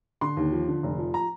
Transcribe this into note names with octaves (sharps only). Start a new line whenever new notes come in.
D3 C6
D#2
F3
D3
F1
F3
A#5